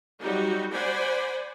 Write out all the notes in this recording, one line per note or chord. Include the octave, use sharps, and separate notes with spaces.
F#3 G3 D#4 F#4 G4
C5 D5 F#5 G#5 B5